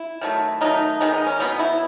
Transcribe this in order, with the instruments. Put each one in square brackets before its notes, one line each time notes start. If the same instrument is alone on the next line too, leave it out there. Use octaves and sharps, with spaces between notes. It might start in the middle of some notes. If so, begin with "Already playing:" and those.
Already playing: [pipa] E4
D#3 F#3 A3
D#3 F#3 A3 D#4
D#3 G#3 B3 D#4
D#4
C#4
B2 F#3 B3 D#4
E4